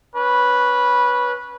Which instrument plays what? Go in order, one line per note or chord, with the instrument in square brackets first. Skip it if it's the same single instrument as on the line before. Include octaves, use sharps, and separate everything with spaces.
[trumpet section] C#4 B4